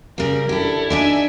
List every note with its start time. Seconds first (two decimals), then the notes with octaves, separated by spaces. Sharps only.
0.18 C#3 G3 A#4
0.49 D4 E4 G4 A4
0.90 D4 D#4 D5 E5 G#5